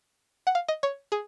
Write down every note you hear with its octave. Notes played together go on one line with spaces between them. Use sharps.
F#5
F5
D#5
C#5
G#4